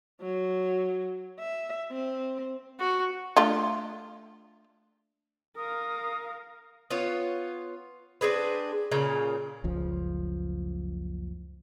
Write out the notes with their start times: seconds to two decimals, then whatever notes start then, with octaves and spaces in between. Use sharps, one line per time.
0.21 F#3
1.39 E5
1.92 C4
2.80 F#4
3.37 A3 D4 F4
5.57 A#4 F5 D#6
6.90 B3 F4 C#5
8.21 C4 D4 G#4 B4
8.92 A#2 C#3 A#4
9.64 F#1 C#2 F3